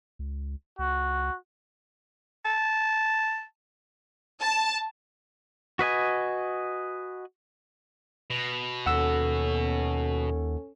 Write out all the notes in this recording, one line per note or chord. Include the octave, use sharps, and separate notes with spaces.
C#2
C#2 F#4
A5
A5
F#4 B4 D#5 G#5
B2
D#2 C#4 A4 F#5 E6